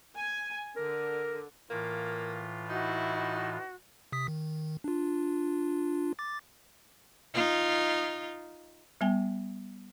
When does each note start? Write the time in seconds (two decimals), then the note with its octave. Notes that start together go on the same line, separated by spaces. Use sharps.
0.15 G#5
0.76 D3 A#4
1.70 A2 E3 A#3 F4
2.70 D#4 E4 F#4
4.12 C3 D#6 B6
4.28 D#3
4.84 D4 F4
6.19 D6 A6
7.34 D#4 F4
9.01 G3 B3 G5 G#5